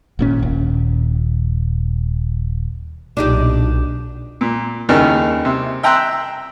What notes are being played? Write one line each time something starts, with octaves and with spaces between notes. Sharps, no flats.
G#1 A#2 C#4
D#1
B1 A#2 D4 D#4 G4
A#2
D#2 C#3 D#4 E4 A#4
C3
E5 G5 A#5 C6 E6 F#6